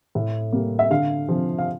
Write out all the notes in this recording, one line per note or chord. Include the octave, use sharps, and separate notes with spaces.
A2
G3 A#3
E5
D3 F5
F3 C4
F5